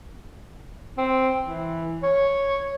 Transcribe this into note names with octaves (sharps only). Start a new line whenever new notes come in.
C4
E3
C#5